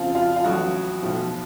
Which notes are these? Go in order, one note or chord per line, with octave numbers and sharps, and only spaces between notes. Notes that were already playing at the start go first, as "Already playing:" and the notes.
Already playing: F2 C#3 F3 F4
F4
F4
A1 A2 F#3 F#4
B1 A2 F3